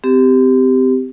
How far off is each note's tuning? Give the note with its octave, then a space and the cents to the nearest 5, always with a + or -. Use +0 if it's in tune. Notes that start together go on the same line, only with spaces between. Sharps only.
C4 -30 G4 +0